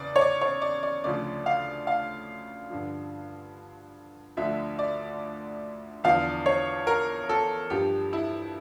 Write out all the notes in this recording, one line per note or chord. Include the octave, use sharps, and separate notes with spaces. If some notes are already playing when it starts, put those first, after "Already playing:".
Already playing: E2 C#3 D5
C#5
D5
C#5
D5
D5
D2 C#3 F3 D5
F5
F5
G2 D3 F3
D2 D3 F3 E5
D5
E2 D3 F3 F5
C#5
A#4
A4
G2 F3 G4
E4